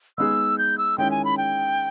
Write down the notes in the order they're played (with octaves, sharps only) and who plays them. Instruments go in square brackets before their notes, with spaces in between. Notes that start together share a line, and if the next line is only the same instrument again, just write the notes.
[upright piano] G#3 B3 D#4 G#4 [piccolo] E6
[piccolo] G6
E6
[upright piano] D#3 G#3 C#4 E4 [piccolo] G5
[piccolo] G#5
B5
G5